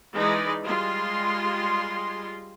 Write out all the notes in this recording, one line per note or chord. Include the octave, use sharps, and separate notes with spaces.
E3 G#3 D#4 B4 D5
G3 G#3 F4 C6